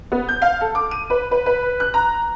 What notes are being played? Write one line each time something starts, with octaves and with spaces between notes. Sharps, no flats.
B3
G6
F5
A4
D6
D#7
B4
B4
B4
F#6
A#5